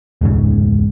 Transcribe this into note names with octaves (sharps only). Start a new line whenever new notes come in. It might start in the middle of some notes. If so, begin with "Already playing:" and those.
E1 C#2 G#2 C#3